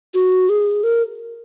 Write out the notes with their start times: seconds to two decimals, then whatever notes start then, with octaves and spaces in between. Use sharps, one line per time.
0.14 F#4
0.49 G#4
0.83 A#4